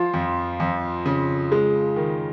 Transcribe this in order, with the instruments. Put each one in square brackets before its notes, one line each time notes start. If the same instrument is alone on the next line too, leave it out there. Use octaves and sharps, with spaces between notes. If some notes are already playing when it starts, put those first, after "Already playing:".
Already playing: [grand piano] F3 [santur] F4
[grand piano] F2
F2
C#3
G#3
D#3